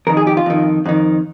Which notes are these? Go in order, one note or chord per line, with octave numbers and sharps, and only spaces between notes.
F2 D#3 A#4
G#4
G4
F4
F2 D#3
F2 D#3